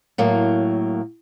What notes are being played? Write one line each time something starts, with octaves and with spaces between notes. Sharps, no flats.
A2 F#3 A#3